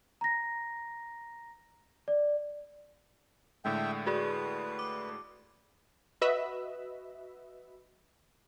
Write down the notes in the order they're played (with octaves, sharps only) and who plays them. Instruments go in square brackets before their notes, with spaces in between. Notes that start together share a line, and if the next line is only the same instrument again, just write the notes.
[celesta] A#5 A#6
D5
[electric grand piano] A2 D3 G#3 [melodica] E5 G5
[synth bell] F#4 G#4 D5 [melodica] B4
[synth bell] D6
[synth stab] F#4 B4 D#5 E5